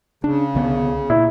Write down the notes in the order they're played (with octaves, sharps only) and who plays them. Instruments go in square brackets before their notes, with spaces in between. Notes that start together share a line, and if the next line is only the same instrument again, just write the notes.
[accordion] C#3 [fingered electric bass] D4
[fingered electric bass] C2 D3 B3
[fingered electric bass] A#2 [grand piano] E4